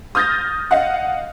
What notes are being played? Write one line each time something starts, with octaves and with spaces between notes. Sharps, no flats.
D#6 F6 G6 A6 A#6
D#5 F5 F#5